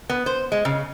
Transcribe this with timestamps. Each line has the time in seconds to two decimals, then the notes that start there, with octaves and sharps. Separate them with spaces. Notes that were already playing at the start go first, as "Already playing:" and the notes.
0.10 B3
0.26 C5
0.52 G#3
0.65 C#3